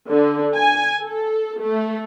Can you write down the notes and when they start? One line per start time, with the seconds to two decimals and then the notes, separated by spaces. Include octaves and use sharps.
0.11 D3
0.55 G#5
1.01 A4
1.60 A3